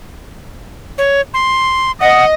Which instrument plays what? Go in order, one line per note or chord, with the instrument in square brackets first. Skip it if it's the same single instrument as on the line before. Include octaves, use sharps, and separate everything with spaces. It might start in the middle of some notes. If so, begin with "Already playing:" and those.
[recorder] C#5
C6
[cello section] D#5 [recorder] F#5